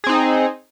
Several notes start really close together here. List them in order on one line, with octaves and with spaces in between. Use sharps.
G#4 C4 D#4